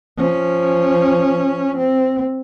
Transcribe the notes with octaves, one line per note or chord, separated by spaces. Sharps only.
F3 C#4
C4